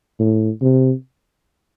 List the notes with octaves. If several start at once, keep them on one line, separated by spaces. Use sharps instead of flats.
A2
C3